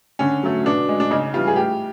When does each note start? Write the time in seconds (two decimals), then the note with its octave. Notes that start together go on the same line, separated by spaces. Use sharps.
0.19 D3 C#4
0.43 F#3 A3
0.65 B2 D4
0.89 G#3
1.00 D4
1.11 C#3 D#4
1.34 E3 G3 F4
1.47 G#4
1.56 A2 G4